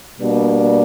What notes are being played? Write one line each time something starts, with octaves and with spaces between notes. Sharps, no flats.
B2 G3 A#3 D4